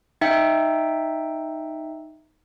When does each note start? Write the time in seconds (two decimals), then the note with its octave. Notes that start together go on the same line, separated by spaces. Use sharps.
0.21 D#4 E5 G5